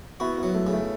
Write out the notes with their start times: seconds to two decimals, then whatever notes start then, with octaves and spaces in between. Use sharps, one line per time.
0.20 B3 E4 F#4
0.38 F#3 B3
0.55 A3
0.67 C#3
0.73 A3